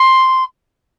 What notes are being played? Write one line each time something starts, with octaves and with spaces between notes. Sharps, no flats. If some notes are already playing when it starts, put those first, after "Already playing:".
Already playing: C6